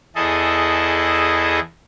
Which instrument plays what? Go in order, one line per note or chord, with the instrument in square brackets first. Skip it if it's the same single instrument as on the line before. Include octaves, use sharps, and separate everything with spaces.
[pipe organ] E2 E4 G#4 A4 D#5